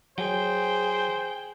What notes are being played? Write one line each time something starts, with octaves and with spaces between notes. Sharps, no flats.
F#3 G#4 C5 G5